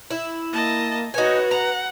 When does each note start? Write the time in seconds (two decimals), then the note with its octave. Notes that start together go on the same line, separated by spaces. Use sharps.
0.11 E4
0.53 A#3 D#5 A5
1.14 D#4 F#4 B4 C#5 G#5
1.51 F#5 A#5